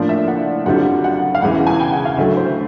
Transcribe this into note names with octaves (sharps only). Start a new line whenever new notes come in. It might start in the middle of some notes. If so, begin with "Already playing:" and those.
Already playing: A2 F3 A#3 D4 F4 D5
E5
F#5
F#2 D3 G3 C4 F4 F#5
F#5
F5
E1 E2 C#3 E3 F#5
G#5
G5
F#5
F5
D2 D3 F#3 A3 E5
C5